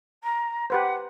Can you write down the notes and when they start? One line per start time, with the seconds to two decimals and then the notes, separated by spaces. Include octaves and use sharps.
0.23 A#5
0.70 G4 B4 C5 F#5